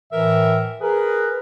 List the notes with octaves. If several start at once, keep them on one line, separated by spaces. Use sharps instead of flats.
A2 E3 A#4 E5
G#4 A#4 B4